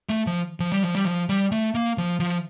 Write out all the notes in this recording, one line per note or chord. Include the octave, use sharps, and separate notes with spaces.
A3
F3
F3
G3
F3
G3
F3
G3
A3
A#3
F3
F3